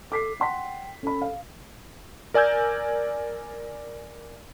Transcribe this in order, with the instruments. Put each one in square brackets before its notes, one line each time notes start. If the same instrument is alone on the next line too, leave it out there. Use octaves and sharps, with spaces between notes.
[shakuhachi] A4 [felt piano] D6 B6 C7
[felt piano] F#5 C6 B6 [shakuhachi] G5
[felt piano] C#4 B5 [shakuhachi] A4
[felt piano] F5
[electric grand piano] A#4 D5 G#5 E6 G6 G#6